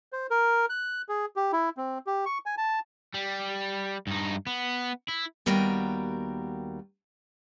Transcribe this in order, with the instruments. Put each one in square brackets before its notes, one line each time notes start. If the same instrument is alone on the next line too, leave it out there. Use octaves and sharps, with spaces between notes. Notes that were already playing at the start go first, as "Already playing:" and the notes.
[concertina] C5
A#4
F#6
G#4
G4
E4
C4
G4
C#6
G#5
A5
[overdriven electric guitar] G3
G2 D#4
B3
E4
[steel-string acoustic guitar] D#2 G3 B3 F#4 A#4 G5